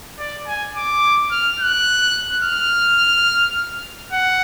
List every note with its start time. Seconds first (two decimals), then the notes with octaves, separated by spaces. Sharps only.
0.19 D5
0.47 G#5
0.76 D6
1.31 F6
1.60 F#6
2.43 F6
4.12 F#5